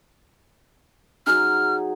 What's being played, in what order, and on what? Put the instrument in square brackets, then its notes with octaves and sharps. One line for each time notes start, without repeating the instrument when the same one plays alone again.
[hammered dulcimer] F#3 D#4 G#4 [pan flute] F6